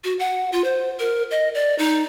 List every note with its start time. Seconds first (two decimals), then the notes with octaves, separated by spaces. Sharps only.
0.04 F#4
0.19 F#5
0.52 F4
0.64 C5
0.99 A#4
1.31 D#5
1.54 D5
1.78 D#4